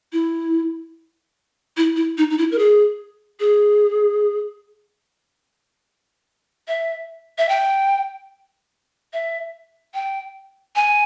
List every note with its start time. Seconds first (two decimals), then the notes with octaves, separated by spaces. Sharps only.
0.13 E4
1.77 E4
1.96 E4
2.18 D#4
2.30 D#4
2.38 E4
2.52 A#4
2.59 G#4
3.40 G#4
6.68 E5
7.38 E5
7.49 G5
9.13 E5
9.94 G5
10.76 G#5